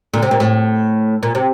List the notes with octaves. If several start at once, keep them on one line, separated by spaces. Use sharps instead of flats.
A#2 D3
C3
A#2
A2
A#2
C3